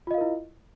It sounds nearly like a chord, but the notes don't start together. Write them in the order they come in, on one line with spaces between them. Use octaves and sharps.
F4 D#5 F5 A#4 E4